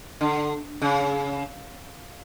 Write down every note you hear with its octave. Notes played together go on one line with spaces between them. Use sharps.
D3
C#3